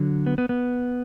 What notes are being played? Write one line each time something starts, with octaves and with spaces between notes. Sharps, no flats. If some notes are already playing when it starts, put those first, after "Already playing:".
Already playing: D3 F#3
B3
B3
B3